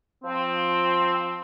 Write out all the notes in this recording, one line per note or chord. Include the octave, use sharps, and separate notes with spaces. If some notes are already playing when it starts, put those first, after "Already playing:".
F3 C4